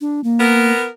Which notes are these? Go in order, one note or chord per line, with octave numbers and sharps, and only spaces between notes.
D4
A#3
B3 A#4